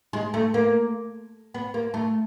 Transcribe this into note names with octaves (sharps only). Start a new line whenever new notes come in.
G#3
A3
A#3
B3
A#3
A3